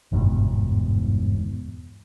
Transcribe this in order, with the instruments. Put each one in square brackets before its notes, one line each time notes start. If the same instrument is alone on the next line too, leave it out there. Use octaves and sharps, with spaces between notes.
[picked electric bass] G1 E2 G#2 B2